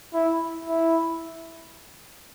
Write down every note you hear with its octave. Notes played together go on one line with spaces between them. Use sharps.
E4
E4